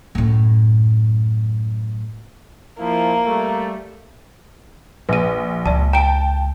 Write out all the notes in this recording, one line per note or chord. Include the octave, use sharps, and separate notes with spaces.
F#2 A2
F3 A#3 E4
G3 A3
A#1 B4 D#7
C#2 D5 A5
G5 A5 A#5 D7